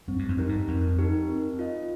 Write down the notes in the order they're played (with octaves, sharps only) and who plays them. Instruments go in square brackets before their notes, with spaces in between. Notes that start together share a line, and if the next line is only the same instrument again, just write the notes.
[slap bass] G2 [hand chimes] C4
[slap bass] G2
F2
[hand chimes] D#4 G4 A#4
[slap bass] G2
[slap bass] F2 [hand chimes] C4
[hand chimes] D#4 G4 A#4
C4
F4 D#5